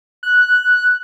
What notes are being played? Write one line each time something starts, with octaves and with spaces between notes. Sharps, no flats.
F#6